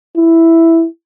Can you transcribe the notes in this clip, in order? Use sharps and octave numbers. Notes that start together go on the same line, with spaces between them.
E4